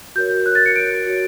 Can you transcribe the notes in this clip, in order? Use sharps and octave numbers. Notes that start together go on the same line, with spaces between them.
F#4 A#4 C#5 G6
F#4 A#4 C#5 F#6
A6
C#7
F#4 A#4 C#5 D7
F#4 A#4 C#5